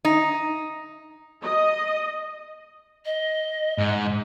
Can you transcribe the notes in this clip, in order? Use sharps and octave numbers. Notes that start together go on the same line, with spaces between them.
D#4
D#5
D#5
G#2